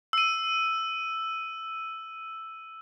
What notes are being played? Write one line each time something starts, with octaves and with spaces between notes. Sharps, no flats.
E6 D#7